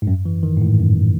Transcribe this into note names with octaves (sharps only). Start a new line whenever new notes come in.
G#2
F#2
E3
D#3
G#2
A2
F#2